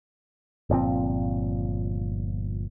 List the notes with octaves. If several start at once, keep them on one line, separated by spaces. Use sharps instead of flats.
G1 A#2 F3 C4